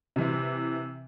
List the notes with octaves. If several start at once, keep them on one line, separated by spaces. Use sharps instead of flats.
C3 E3